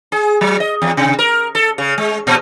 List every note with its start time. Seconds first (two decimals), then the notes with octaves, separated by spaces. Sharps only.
0.12 G#4
0.41 F#3
0.60 D#5
0.82 E2
0.97 C3
1.19 A#4
1.55 A4
1.78 C#3
1.98 G#3
2.27 A#2